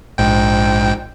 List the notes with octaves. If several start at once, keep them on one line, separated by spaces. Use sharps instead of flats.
A#1 G#2 G5